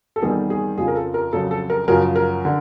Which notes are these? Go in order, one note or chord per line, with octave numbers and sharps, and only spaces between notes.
A4
E2 C3 D#3 G3 G#4
G#4
F2 C#3 F3 G#4
A#4
A4
A#4
F2 C#3 F#3 A4
A4
A#4
F#2 C#3 F3 A#4
A#4
D3